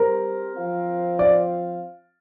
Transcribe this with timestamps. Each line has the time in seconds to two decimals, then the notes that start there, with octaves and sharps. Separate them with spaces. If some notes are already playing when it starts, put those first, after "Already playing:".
Already playing: G3 C4 G4 A#4 C5
0.55 F3 C4 F4 C5 F5
1.19 D5